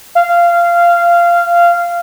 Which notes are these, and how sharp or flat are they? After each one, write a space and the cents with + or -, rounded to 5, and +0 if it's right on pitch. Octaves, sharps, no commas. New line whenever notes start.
F5 -15